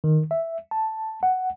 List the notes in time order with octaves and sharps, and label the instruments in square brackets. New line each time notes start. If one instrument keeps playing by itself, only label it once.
[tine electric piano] D#3
E5
A5
F#5